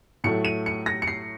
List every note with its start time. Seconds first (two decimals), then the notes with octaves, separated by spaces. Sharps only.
0.24 A2 F#3 A3 C#7
0.45 D#7
0.66 C#7
0.86 A#6
1.02 C#7
1.07 C7